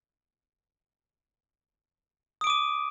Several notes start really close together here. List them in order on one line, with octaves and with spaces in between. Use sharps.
D#6 D7 D6 D#7